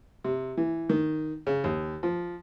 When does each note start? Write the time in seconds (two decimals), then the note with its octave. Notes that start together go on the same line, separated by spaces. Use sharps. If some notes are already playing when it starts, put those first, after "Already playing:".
0.24 C3
0.57 E3
0.90 D#3
1.47 C#3
1.64 D#2
2.03 F3